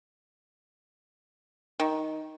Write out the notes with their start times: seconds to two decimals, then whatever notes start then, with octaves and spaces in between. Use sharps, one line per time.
1.80 D#3